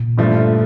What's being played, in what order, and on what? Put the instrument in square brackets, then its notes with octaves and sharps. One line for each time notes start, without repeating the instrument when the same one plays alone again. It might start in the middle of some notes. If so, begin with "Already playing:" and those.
Already playing: [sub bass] A#2
[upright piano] G1 G2 D3 F3 A3